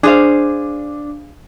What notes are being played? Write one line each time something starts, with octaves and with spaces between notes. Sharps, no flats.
D4 G#4 C5 F5